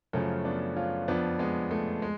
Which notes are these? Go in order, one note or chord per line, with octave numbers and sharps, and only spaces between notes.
F#2 C#3 F3 A3 C#4
B3 D4
C#4 F4
F2 F3 B3 D4
G#3 B3
A3
G#3